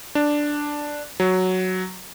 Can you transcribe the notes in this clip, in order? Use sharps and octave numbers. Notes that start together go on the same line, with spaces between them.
D4
F#3